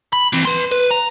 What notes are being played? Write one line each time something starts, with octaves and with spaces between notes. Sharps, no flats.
B5
E3 C4
B4 C6
B4
A#5